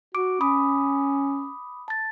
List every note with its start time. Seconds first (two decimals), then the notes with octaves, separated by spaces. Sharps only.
0.15 F#4 D6 D7
0.41 C#4 B5 D6 D#6
1.88 A5 A6